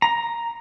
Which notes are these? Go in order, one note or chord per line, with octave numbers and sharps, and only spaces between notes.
A#5